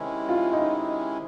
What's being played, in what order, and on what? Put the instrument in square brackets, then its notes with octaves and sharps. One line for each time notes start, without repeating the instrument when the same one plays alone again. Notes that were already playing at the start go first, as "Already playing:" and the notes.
Already playing: [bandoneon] C3 D#3 G#3 C#4 E4
[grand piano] F4
D#4